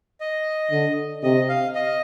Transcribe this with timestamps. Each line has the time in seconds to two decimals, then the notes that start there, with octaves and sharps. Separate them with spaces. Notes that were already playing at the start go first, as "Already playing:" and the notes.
0.21 D#5
0.72 D3
1.23 C3 D#5
1.49 F5
1.75 D#5